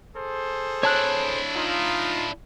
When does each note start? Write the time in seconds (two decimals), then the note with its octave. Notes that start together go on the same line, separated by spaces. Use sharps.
0.16 G#4 A4 C5
0.83 D4 E4 C#5 A5 F#6
1.55 D#4 F4